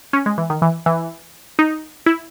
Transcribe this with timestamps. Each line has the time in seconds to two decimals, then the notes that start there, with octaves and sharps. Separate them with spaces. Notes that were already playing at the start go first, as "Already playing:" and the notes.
0.13 C#4
0.26 G#3
0.38 E3
0.50 D#3
0.62 E3
0.86 E3
1.59 D#4
2.06 E4